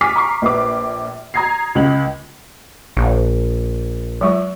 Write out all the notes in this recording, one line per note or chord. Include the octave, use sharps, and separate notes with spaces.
G#5 D6 F6 B6
A#5 C#6 D6 C7
A#1 B4 D6
A#5 D#6 G#6 A#6 C7
C#2 F#7
A#1 F4
F#3 G#3 F4